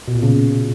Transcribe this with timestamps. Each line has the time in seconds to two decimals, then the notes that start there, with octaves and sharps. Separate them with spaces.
0.08 B2
0.15 A#2
0.23 C#3